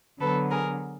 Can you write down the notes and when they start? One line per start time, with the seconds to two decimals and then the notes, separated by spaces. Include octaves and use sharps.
0.19 D3 F#3 B3 A4 B4
0.50 G#4 A#4